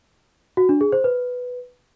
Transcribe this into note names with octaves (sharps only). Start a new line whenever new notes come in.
F#4
D4
G#4
C5
B4